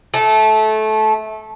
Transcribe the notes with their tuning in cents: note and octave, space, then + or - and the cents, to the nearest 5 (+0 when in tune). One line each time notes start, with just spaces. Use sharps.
A3 -20